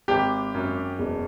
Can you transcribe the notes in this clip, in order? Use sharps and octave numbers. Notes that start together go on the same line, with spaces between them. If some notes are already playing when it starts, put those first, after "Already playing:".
G#1 G4
F#2
E1